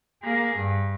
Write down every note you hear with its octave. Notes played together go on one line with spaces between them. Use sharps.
A#3 G#4
G2